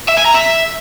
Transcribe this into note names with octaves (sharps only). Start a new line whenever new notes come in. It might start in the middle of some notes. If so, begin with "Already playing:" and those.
E5
G#5
A#5
E5